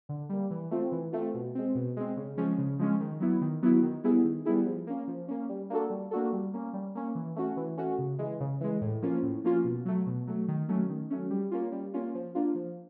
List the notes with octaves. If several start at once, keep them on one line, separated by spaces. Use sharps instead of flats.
D3
G3 A#3
E3
A3 C4 F4
E3
A3 C4 F4
B2
G#3 C4
B2
G#3 C4
C#3
F3 G#3 C#4
C#3
F3 G#3 C#4
D#3
F#3 B3 E4
D#3
F#3 B3 E4
D#3
G3 B3 E4 G#4
D#3
G3 B3 E4 G#4
F3
A#3 C#4
F3
A#3 C#4
G3
A#3 D4 F#4 A4
G3
A#3 D4 F#4 A4
G3
A#3 C#4
G3
A#3 C#4
E3
A3 C#4 F#4
E3
A3 C#4 F#4
C#3
E3 G#3
C#3
E3 G#3
A2
F3 A#3 C#4 F4
A2
F3 A#3 C#4 F4
B2
F#3 A3
B2
F#3 A3
D#3
F#3 A3 C#4
D#3
F#3 A3 C#4
G3
A#3 C#4 F4
G3
A#3 C#4 F4
F3
A#3 D4 F4
F3